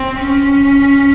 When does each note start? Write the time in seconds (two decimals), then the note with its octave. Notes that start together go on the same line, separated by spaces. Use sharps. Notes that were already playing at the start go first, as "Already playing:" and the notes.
Already playing: C4
0.22 C#4